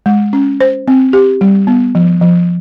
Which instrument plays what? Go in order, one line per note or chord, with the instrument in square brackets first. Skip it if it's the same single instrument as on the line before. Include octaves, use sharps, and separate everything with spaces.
[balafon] G#3
C#4
C5
C4
G4
G3
B3
F3
F3